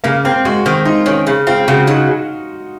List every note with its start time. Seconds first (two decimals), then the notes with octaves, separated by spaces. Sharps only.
0.04 C#3 A#3
0.25 A#3 C4
0.45 G#3 F#4
0.66 D#3 C4
0.85 D#4 F4
1.06 D#3 C#4
1.27 C#3
1.47 C4 F4
1.68 C#3 F#4
1.87 F#3 D#4